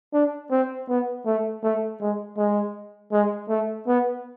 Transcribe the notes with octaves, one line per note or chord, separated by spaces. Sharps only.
D4
C4
B3
A3
A3
G#3
G#3
G#3
A3
B3